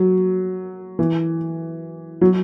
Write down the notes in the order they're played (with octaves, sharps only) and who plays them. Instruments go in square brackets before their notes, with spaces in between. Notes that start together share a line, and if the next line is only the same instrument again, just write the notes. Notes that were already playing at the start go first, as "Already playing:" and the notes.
Already playing: [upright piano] F#3
E3
F#3